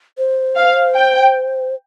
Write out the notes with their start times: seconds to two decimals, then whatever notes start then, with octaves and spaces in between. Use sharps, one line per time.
0.18 C5
0.56 F5
0.95 G5